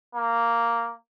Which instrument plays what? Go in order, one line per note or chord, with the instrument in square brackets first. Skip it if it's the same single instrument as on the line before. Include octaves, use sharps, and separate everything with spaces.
[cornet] A#3